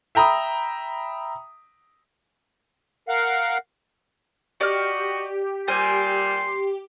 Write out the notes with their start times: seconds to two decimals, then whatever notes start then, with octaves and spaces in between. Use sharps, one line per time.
0.15 E5 G5 A#5 B5 D#6
3.08 A#4 F5 F#5
4.61 F#4 G4 D5 D#5 F6
5.68 A#2 G3 C5 G#5 C6